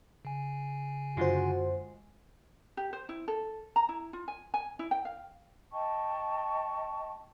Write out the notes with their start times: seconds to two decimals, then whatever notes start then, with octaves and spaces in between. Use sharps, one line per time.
0.25 C#3 G#5
1.17 F#2 D3 G#3 F4 F#4 C5
2.77 G4
2.93 C5
3.09 E4
3.28 A4
3.76 A#5
3.89 E4
4.13 F4
4.28 G#5
4.54 G#5
4.79 E4
4.91 G5
5.05 F5
5.72 D#5 G5 A5 C#6